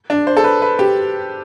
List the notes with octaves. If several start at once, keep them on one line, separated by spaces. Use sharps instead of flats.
D4
C5
A4
B4
B4
G4